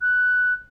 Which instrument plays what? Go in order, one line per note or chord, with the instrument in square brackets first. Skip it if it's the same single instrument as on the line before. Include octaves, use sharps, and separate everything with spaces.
[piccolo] F#6